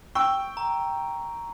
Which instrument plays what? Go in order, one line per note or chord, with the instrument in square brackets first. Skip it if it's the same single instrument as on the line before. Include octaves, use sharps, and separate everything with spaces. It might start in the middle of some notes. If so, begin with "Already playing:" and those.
[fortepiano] G5 E6 [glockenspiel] C#6
[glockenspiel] A#5